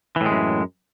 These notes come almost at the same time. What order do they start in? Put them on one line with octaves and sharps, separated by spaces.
E3 A2 G#3 F#2